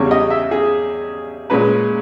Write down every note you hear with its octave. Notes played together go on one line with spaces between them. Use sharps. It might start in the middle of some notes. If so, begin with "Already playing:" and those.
Already playing: E2 C#3 G3 C#4 C#5
D#5
E5
G#4
A#2 G#3 C#4 B4